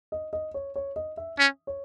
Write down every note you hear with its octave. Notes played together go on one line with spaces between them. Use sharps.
D#5
D#5
C#5
C#5
D#5
E5
C#4
C#5